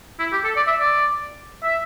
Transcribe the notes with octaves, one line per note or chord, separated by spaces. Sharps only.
E4
G4
A4
D5
E5
D5
E5